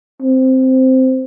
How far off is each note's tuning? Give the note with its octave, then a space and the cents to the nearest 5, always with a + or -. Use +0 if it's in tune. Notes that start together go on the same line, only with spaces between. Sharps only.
C4 -5